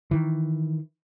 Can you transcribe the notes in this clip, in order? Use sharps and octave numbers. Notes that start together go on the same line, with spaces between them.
D#3 E3